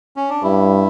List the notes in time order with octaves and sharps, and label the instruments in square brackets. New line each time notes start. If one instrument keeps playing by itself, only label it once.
[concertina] C#4
D4
[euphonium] G2 [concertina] E4